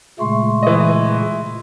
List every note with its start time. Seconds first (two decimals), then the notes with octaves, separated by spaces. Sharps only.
0.19 A#2 C#3 G#3 A3 C6 C#6
0.63 E3 D#5